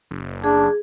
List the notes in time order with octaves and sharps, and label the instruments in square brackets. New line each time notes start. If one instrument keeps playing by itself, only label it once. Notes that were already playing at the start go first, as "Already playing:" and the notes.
[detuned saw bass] F#1
[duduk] D4 [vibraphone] G#4